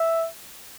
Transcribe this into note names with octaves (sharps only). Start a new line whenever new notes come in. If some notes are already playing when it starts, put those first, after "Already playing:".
Already playing: E5